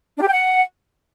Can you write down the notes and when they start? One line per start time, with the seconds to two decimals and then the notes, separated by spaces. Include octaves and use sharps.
0.17 D4
0.22 G4
0.27 G5
0.33 F#5